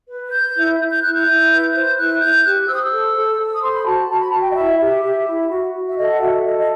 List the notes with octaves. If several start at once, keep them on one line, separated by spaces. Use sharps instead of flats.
B4
B4 G6
E4
E4
G6
E4 F#6
G6
E4
B4
C5 G6
E4 F#6
E4 G6
G4 F#6
C5 E6
D#6
E6
A4
A4
A4
D#6
C5 C6
B5
F#4 A5
F#4 A5
B5
F#4 A5
G5
D#5
E4 E5
G4 E5
G4
E4
F#4
F#4
E5
A4 D#5
F#5
F#4 E5
A4 D#5
D#5